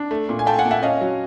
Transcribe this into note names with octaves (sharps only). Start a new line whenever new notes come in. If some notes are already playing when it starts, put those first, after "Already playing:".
Already playing: D4
A3
A#2
G#5
A3 G5 A5
F#5 G#5
A#2
E5 F#5
C#4 D#5 F5
F#3